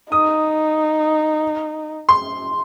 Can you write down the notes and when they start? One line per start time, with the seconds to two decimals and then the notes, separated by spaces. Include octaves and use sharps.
0.11 D#4 D#6
2.09 C6